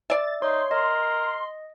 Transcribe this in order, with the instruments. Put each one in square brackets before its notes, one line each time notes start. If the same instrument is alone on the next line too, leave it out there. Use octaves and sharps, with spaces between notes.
[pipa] D5 E5 [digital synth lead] A6
[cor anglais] D#4 [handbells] C#5 [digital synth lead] C6
[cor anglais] A#4 [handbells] D#5